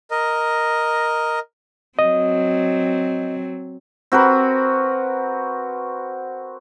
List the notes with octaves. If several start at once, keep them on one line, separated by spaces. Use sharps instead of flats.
A#4 D#5
F#3 C4 D#5
C4 F#4 A#4 B4